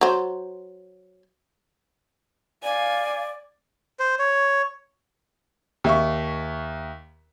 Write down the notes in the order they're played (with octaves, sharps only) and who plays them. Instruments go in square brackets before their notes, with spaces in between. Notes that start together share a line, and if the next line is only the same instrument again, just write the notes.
[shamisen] F#3 C5
[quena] D5 [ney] F5 [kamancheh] G#5
[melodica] C5
C#5
[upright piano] D#2 E5 C#6